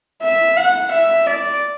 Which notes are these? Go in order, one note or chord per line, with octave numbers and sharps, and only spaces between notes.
E5
F#5
E5
D5